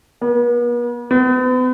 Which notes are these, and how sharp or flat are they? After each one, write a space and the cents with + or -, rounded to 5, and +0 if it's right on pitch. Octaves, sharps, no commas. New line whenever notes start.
B3 -45
B3 +40